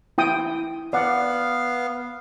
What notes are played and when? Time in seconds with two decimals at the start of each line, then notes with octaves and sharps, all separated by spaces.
0.18 E4 G5 D#6
0.93 B3 D5 F5 F#5